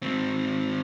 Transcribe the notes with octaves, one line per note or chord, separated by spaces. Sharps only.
G#2 C4